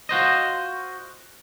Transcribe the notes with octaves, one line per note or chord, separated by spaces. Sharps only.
F4 F#4 C5 D#5